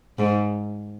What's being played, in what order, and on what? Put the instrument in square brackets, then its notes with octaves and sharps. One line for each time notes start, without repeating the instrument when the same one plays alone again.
[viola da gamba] G#2